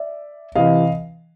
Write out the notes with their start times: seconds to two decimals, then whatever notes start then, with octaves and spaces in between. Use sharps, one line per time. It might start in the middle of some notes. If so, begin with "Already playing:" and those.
Already playing: D5 E5
0.55 C3 E3 D#5 F5